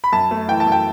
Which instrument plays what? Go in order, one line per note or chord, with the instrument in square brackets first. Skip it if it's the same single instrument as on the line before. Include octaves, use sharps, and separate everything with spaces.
[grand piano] B5
F#2 A5
A3
E3 G5
A5
F#2
G5